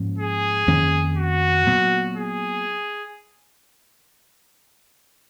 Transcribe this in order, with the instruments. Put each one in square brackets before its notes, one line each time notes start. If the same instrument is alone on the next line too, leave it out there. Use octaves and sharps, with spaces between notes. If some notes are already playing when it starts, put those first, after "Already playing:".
Already playing: [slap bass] G#2 F3 A#3 C#4
[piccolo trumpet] G#4
[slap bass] F2 D#3 A#3 C#4
[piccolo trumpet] F#4
[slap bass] A#2 F#3 B3
[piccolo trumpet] G#4